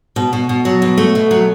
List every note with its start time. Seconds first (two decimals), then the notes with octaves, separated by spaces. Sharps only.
0.16 B2
0.33 B2
0.49 B2
0.65 F#3
0.82 B2
0.98 A3
1.15 B2
1.31 F#3